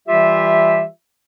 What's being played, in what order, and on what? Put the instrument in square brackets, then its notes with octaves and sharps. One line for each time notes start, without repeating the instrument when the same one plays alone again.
[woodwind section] E3 G3 F4 G4 E5